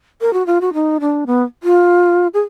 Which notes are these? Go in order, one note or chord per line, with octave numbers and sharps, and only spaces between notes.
A#4
F#4
F4
F#4
D#4
D4
B3
F4
G#4